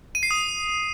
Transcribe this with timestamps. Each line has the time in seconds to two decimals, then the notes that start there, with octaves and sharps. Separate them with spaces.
0.15 D#7
0.23 C7
0.31 D#6